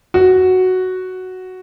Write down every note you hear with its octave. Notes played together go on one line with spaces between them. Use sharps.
F#4